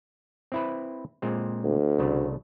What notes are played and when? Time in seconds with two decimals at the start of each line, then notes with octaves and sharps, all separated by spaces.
0.52 C4 E4 B4
1.22 A#2 G#3 C4
1.63 D2
1.99 C2 C#3 A3